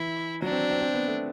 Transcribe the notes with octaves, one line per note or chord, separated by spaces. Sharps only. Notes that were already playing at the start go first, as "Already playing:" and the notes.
Already playing: E3 E4
F#3 D4
C4
C4
C4
B3
A3